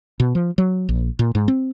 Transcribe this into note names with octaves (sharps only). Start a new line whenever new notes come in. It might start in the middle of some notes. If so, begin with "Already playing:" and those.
B2
F3
F#3
A#1
A#2
G#2
C4